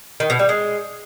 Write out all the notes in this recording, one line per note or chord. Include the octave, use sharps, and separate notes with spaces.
D#3
B2
G3
G#3